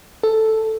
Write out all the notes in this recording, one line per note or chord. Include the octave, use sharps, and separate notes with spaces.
A4